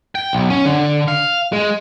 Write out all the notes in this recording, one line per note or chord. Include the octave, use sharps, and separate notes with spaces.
G5
B1
C#4
D3
F5
G#3